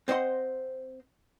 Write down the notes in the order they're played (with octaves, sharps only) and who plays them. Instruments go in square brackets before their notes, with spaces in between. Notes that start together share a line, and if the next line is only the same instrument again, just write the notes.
[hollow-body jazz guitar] C4 C5 D#5 F#5 C6